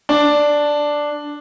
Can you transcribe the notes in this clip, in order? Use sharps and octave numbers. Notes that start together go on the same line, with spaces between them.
D4